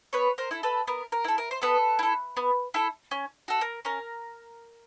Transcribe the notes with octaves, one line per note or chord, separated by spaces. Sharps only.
B3 B4 C#5
A#4 C5
E4 A4
A4 B4
B3 A#4
A#4
E4 A4
A#4
C5
B3 A4 B4
E4 A4
B3
E4 A4
C#4
F#4 A4
A#4
C#4 A#4